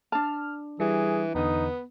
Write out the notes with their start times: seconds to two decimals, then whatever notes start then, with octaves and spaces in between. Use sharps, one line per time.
0.12 D4 A5 F6
0.80 E3 G3 G#4
1.35 E2 D3 B3 D#4 D#6